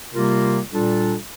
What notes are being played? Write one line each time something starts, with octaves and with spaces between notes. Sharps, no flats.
C3 G3 A#3 F4 A#4
A#2 G3 D4 F4 A4